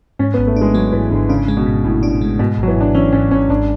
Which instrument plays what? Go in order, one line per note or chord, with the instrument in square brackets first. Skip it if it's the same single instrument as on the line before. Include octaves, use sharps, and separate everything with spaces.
[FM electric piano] G#2 [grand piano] C#4
[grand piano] B3
[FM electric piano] G#1
[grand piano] A3
[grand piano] G#3 [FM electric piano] D4
[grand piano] F#3 [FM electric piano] G#3
[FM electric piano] G#2 [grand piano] E3
[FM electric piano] G#1 [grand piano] D3
[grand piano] C#3 [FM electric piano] D4
[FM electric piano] G#3
[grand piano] B2
[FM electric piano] G#2
[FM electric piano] G#1 [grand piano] A2
[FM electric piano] D4
G#3
[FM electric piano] G#2 [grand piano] B2
[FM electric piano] G#1
[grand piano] F#3
E3
[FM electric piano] G#1 [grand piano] D4
[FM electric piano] E3 [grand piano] C#4
[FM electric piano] G#2 [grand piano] C#4
[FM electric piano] G#1 [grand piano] C#4
[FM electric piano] G#1 [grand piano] D4